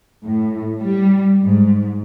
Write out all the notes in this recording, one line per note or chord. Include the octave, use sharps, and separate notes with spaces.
A2
G3
G#2